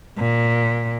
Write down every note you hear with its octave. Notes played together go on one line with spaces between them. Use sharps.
A#2